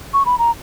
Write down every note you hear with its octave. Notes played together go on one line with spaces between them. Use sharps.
C#6
B5
A#5